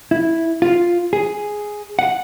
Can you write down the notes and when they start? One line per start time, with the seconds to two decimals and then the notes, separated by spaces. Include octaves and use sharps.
0.11 E4
0.62 F4
1.13 G#4
1.99 F#5